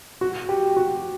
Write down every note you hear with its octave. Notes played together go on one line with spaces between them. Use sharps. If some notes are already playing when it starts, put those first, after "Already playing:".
F#4
G4
F#4